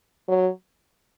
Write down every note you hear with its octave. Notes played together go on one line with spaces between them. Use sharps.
F#3